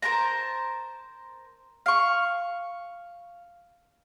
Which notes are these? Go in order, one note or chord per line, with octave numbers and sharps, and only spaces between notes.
A#4 C5 A5 A#5
F5 C#6